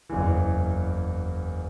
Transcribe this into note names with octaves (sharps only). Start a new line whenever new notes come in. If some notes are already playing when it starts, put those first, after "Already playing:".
F#1 E2 E3